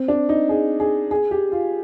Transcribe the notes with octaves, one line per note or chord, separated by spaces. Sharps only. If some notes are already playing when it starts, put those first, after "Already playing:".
Already playing: C4
D4
D#4
G#4
G#4
G#4
G4
F4